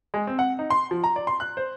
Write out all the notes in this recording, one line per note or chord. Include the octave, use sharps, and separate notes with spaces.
G#3
C4
F#5
D#4
C6
F3
A#5
D5
C6
F#6
C5